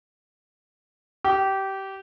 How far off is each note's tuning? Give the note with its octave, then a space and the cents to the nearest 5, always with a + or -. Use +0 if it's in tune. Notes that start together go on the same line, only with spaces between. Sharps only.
G4 -20